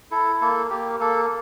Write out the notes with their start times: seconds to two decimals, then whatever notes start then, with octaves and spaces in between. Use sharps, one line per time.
0.11 E4 A4
0.41 A#3 A4
0.70 A#3 G4
1.00 A#3 A4